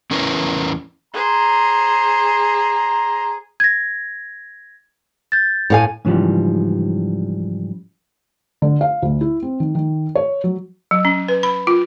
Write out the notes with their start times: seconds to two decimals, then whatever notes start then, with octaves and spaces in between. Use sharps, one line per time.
0.11 E2 C#4 E4 A#4 B4
1.14 G#4 C5 A#5
3.60 G#6 A#6
5.32 G6 A6
5.70 A2 F5 G#5
6.05 G#2 C#3 E3 F3 G3
8.62 D3
8.81 F5
9.02 D2
9.21 E4
9.42 C4
9.60 D#3
9.75 D#3
10.15 C#5
10.44 F#3
10.91 F#3
11.05 C#4
11.28 B4
11.43 B5
11.67 F4